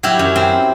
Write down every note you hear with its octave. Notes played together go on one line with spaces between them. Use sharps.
F#3 E4 G4
F#2
C4